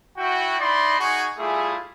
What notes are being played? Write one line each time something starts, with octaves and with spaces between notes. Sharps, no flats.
E4 F#4 G5
D#4 E4 D5 D#5 B5 C6
D#4 F#4 G#4 G#5 C#6
G3 A3 E4 F4 G#4